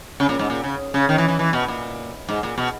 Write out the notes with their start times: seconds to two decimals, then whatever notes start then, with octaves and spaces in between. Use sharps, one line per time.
0.20 C#3
0.29 A#2
0.39 G#2
0.50 A#2
0.64 C#3
0.94 C#3
1.09 D#3
1.18 E3
1.28 E3
1.39 E3
1.53 B2
1.68 A#2
2.29 G#2
2.43 A#2
2.58 B2